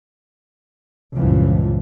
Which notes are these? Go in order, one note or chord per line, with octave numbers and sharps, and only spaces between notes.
C#2 G2 A#2 E3 F3